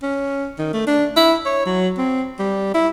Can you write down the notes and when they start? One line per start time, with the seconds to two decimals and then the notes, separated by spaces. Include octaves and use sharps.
0.03 C#4
0.59 D#3
0.73 A3
0.87 D4
1.16 E4
1.45 C#5
1.66 F#3
1.98 C4
2.39 G3
2.74 E4